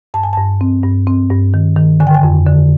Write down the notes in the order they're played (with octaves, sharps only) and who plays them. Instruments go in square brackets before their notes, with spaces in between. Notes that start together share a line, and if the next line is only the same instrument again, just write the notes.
[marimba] G2 A5
G#5
G2 A5
C4
G2
C4
G2
D#3
D#3
D3 G#5
G5
G#5
F2
D3